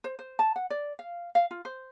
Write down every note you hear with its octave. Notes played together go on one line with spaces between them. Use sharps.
C5
C5
A5
F#5
D5
F5
F5
F4
C5